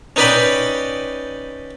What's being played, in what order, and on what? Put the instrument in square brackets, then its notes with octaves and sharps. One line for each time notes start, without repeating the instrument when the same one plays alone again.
[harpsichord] C#4 D#4 B4 D5 G5 B5